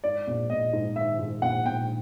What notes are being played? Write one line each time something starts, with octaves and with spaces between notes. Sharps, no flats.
G#2 D5
A#1
A#1 D#5
G#2
D#3 E5
G#2
A#1 F#5
A#1 G5